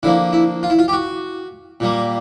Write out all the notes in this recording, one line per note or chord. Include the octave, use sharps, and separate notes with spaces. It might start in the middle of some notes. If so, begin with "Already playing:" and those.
D3 F3 A#3 E4
E4
F4
E4
F4
G4
F#4
A#2 G3 A#3